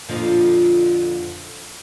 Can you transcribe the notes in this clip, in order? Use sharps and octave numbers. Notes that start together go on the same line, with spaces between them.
F2 A#2 D3 F3 F4